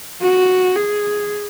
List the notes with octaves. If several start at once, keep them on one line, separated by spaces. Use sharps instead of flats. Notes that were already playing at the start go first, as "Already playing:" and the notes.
F#4
G#4